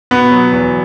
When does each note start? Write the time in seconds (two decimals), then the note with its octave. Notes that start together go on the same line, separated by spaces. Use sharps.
0.11 B2 B3
0.31 F#3
0.52 E2